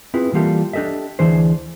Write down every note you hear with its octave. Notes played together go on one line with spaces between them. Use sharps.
C4 E4 F4 G#4 B4
E3 G3 A#3 F4 G4 A4
D4 G4 A4 D#5 E5
D2 E3 D4 G#4 C5